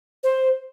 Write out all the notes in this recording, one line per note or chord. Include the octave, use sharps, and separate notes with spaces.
C5